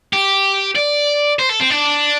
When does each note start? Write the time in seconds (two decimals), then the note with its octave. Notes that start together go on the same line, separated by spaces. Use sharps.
0.13 G4
0.75 D5
1.39 C5
1.49 A4
1.60 C4
1.70 D4